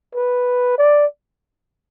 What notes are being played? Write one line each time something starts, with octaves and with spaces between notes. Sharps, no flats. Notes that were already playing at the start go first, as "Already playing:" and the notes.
B4
D5